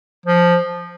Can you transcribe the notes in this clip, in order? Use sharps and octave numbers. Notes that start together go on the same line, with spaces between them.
F3